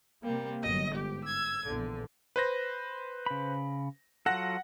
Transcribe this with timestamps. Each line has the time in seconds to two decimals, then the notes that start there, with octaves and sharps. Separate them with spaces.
0.24 C3 G3 A#3
0.61 G1 F#3 D#5 A#6
0.94 G#2 G4
1.24 E6 G#6
1.65 A#1 E2 D3
2.36 B4 C5 A#6
3.26 C#3 B5
4.26 F#3 F4 A4 F#5 F#6 A#6